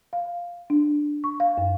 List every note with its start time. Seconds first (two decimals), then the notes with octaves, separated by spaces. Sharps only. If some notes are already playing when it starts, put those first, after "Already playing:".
0.13 F5
0.70 D4
1.24 C#6
1.40 F5
1.58 F#2